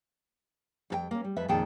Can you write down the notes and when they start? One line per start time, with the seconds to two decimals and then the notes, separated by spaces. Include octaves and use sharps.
0.90 F2 A4 G5
1.11 A#3 C#4
1.24 G3
1.36 F2 B4 E5
1.48 F2 A#2 D#3 G#4 G5 A5